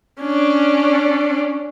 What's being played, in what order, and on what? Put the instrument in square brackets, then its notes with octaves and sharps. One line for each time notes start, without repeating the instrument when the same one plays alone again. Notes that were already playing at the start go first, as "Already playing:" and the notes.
[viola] C#4 D4